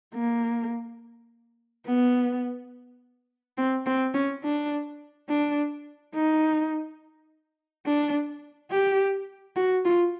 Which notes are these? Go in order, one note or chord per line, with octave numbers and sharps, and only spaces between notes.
A#3
B3
C4
C4
C#4
D4
D4
D#4
D4
G4
F#4
F4